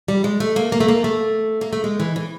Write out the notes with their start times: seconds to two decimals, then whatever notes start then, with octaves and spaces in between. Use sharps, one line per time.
0.08 G3
0.24 G#3
0.40 A3
0.56 A#3
0.72 A#3
0.80 A3
0.88 A#3
1.04 A3
1.61 A#3
1.73 A3
1.84 G#3
2.00 E3
2.16 E3